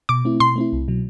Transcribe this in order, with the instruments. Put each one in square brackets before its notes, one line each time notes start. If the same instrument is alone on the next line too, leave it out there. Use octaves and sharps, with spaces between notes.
[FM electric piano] B2 [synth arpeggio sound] D6
[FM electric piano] A3 C4 E4
[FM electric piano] B2 [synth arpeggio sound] C6
[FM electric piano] A3 C4 E4
C2
B2 F#3